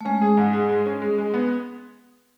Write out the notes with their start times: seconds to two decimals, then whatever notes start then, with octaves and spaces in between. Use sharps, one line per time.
0.01 A3
0.05 G#3 C#4
0.21 G#4
0.37 G#2
0.53 G#4
0.69 G#3
0.86 C#4
1.02 G#3
1.18 G#3
1.34 B3